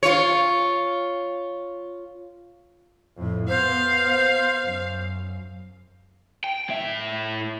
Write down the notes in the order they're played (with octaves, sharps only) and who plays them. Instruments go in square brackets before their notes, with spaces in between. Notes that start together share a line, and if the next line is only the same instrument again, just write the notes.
[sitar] F4 C#5
[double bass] F2 A2
[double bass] B3 [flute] C5 [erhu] F5
[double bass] F#2
[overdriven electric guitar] G5
A2 E5